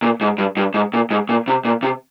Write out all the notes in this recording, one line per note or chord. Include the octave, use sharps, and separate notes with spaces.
A#2
G#2
G2
G2
G#2
A#2
G#2
A#2
C3
A#2
C3